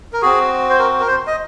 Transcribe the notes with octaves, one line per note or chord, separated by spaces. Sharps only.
A#4
C4 F#4 G#4
C5
A#4
A#4
C5
D#5